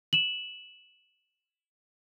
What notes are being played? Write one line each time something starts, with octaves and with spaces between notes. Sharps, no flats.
E7 F#7